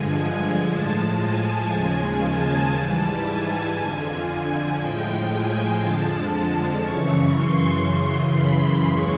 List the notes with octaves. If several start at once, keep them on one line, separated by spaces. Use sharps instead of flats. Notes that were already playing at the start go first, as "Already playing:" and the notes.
Already playing: G2 D3 F3 G#3 G#5
A2 F3 G#3 A5
G#5
D#2 C#3 F3 G#3
A5
G#2 E3 G3
G#5
F2 D3 F3
A2 F3 G#3 G5
G#5
F2 D3 F3 G#3 A5
F#2 C#3 E3 C#6
C6
F#2 C#3 E3
B5
D#2 C#3 E3 G#3 C#6